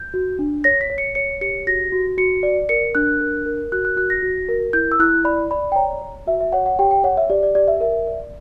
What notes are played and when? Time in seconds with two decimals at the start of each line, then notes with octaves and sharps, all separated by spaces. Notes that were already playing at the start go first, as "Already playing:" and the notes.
Already playing: G6
0.14 F#4
0.39 D4
0.64 C#5 A#6
0.81 B6
0.90 C#5
0.98 C#7
1.15 C#5 C#7
1.41 G4 C#7
1.67 F#4 A#6
1.92 F#4
2.18 F#4 C#7
2.43 D5
2.69 A#4 C#7
2.95 D4 F#6
3.21 A#4
3.46 A#4
3.72 F#4 F#6
3.85 F#6
3.97 F#4 F#6
4.10 A#6
4.23 F#4
4.49 A#4
4.73 E4 G6
4.92 E6
4.99 E4 F#6
5.25 D5 B5
5.51 D5 B5
5.72 G5
5.76 C#5 A#5
6.02 C#5
6.27 F#4 E5
6.41 E5
6.52 C#5 F#5
6.66 F#5
6.79 G4 G5
6.91 G5
7.04 C#5 F#5
7.17 E5
7.30 G4 D5
7.43 D5
7.55 G4 D5
7.68 E5
7.80 A#4 E5
8.07 D5